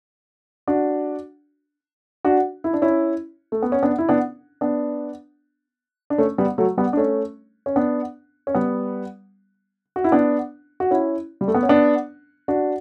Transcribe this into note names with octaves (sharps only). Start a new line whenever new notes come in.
D4 F#4
D4 F#4
E4
D4
C#4 E4
A3
B3
C#4
B3 D4
E4
B3 D4
B3 D4
D4
A3 C#4
G3 B3
F#3 A3
G3 B3
D4
A3 C#4
C#4
B3 D4
C#4
G3 B3
F#4
E4
B3 D4
F#4
C#4 E4
G3
A3
B3
C#4
B3 D4
D4 F#4